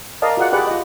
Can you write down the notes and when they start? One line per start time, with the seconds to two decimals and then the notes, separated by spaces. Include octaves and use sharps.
0.22 A#4 D5 D#5 F5 A5
0.37 F4 F#4 G#4 D5 F#5
0.52 G4 G#4 B4 D5 F#5
0.67 F4 D#5